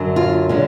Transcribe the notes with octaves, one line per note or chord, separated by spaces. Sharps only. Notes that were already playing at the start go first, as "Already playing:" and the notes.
Already playing: F#2 D3 F#3
F4
D3 G#3 C#4